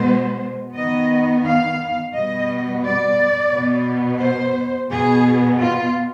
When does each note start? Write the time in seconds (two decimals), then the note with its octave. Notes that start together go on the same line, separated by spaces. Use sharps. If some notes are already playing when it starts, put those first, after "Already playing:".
Already playing: B2 G#3 B3 C5
0.75 D#3 B3 D#5
1.44 F5
2.13 B2 G3 B3 D#5
2.83 D5
3.52 B2 B3
4.20 C5
4.90 B2 B3 G#4
5.60 F4